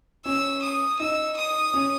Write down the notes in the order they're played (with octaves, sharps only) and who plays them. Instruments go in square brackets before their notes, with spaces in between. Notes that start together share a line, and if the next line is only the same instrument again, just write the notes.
[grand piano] C#4 [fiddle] E6
[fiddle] D#6
[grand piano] D#4 [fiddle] E6
[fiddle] D#6
[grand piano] C#4